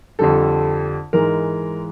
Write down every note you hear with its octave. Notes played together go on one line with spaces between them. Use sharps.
F2 D3 G3 A4
G#2 E3 G#3 A#4